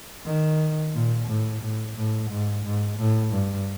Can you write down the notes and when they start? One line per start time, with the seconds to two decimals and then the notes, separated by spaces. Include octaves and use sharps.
0.26 D#3
0.93 A#2
1.28 A2
1.61 A2
1.96 A2
2.30 G#2
2.64 G#2
2.98 A2
3.32 G2